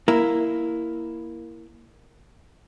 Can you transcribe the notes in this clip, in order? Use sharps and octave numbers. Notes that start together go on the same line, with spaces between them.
A#3 E4